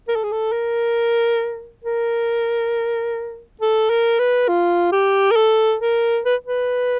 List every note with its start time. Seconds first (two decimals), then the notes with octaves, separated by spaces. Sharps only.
0.08 A#4
0.16 A4
0.24 G#4
0.32 A4
0.52 A#4
1.84 A#4
3.61 A4
3.90 A#4
4.19 B4
4.48 F4
4.92 G4
5.31 A#4
5.36 A4
5.81 A#4
6.25 B4
6.46 B4